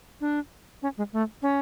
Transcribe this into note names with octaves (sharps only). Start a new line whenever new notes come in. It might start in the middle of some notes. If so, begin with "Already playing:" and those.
D4
C#4
G#3
A3
C#4